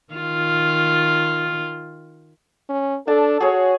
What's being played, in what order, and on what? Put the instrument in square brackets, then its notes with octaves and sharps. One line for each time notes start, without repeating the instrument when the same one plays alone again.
[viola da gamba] D#3 F4
[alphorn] C#4
[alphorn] D4 [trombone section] A4 [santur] A5
[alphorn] F#4 [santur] G#4 C#5